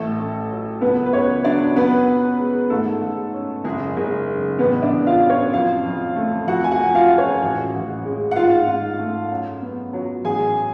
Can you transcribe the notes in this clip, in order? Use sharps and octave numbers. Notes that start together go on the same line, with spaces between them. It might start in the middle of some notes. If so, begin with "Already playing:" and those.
Already playing: A1 A3 A4
A3
F#3
C#2 B3 B4
B4
C#2 C#4 C#5
F#3 D4 D5
F#2 B3 B4
B3
G#3
G#2 A3 A4
G#2
C#4
F#1 G#3 G#4
F#1
C#3
A1 B3 B4
D4 D5
A1
F4 F5
F#3
C#4 C#5
F2 F4 F5
F2
A3
F2 F#4 F#5
G#5
F#4 F#5
F2
F4 F5
G#3
C#4 C#5
A1 F#4 F#5
A1
G#3
F#5
G#2 F4 F5
G#2
A3
F#2
B3
F#3
A1 G#4 G#5